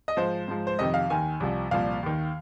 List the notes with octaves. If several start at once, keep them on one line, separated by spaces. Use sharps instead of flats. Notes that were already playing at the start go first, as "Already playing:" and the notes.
D#5
G#2 F3 C5
G#2 F3
C5
F2 C3 D#3 D#5
F5
D#2 D#3 G#5
C2 C3 F3
C2 A#2 F3 F5
D#2 D#3